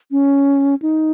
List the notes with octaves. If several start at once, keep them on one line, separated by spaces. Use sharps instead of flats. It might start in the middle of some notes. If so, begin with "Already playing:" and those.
C#4
D#4